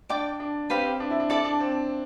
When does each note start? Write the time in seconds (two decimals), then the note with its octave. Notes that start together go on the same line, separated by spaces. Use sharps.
0.09 D4 D5 G5 D6
0.40 D4
0.70 C4 G4 B4 F5 B5
0.85 C4
1.00 D4
1.10 E4
1.20 D4
1.30 E4 A4 D5 A5 D6
1.45 D4
1.60 C4